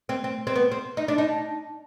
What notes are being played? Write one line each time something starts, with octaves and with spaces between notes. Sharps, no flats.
C4
C4
C4
B3
C4
D#4
D4
D#4